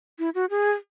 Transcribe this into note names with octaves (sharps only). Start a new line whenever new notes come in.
E4
F#4
G#4